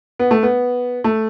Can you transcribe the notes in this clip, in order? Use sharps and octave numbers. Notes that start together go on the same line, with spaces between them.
B3
A3
B3
A3